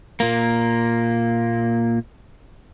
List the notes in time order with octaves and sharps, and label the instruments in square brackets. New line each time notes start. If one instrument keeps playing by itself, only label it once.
[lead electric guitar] A#2 A#3